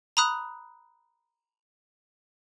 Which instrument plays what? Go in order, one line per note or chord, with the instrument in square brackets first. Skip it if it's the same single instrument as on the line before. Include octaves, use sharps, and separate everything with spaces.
[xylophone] A#5 B5 D#6 F#6